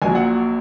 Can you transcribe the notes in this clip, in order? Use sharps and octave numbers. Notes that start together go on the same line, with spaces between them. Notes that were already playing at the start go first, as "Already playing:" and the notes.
A#1 A#2 F#3 G#5
F#5